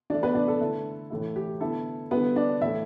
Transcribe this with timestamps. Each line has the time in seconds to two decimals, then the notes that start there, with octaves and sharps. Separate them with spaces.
0.10 E3 A3 D4 E4 D5
0.23 B3 B4
0.35 D4 D5
0.48 A4
0.61 D3 A3 E4
1.10 A2 E3 A3 E4
1.36 G4
1.61 D3 B3 E4 A4
2.11 D3 G3 B3 E4 B4
2.36 D4 D5
2.61 A2 E3 A3 E4 E5